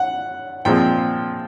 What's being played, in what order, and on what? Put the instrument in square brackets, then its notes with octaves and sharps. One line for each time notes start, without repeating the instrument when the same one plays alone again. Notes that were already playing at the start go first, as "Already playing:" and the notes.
Already playing: [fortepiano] F#5
A#2 F3 G#3 C4 G5